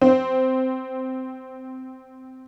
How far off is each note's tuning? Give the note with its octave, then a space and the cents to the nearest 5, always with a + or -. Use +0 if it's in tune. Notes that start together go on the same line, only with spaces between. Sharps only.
C4 -10